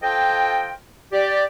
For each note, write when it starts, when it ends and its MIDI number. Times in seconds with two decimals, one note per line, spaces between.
0.03 0.72 65
0.03 0.72 69
0.03 0.72 72
0.03 0.72 75
0.03 0.72 79
1.13 1.43 67
1.13 1.43 74